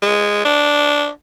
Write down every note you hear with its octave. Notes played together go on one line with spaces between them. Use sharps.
G#3
D4